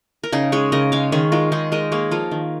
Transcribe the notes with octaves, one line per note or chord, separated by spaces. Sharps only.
A#4
C#3 D#4 G#4
G#3 G#4 C#5
C#3 A#4 D#5
G#3 C#5 F5
D#3 G#4 C#5
G#3 F4 A#4
D#3 D#4 G#4
G#3 A#4 D#5
A#3 G#4 C#5
F3 F4 A#4
D#3